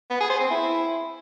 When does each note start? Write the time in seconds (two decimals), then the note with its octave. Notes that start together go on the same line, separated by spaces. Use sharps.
0.10 B3
0.20 G#4
0.30 C5
0.40 C4
0.50 E4